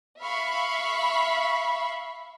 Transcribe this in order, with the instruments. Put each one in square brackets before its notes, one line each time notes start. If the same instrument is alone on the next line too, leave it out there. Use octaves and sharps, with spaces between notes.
[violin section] E5 F5 B5 C#6